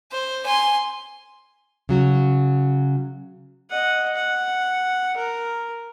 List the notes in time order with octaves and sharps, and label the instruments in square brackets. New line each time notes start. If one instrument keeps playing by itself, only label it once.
[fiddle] C5
G#5 C6
[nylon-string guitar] C#3 F#3 F#4
[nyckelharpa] D#5 F#5
F#5
A#4